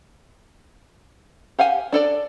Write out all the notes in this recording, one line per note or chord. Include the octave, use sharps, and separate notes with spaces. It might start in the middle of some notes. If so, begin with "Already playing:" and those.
G4 F5 F#5 G#5
D4 A4 D5